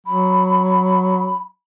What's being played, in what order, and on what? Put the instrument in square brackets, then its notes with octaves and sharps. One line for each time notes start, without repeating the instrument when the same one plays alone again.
[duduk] F#3 [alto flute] B5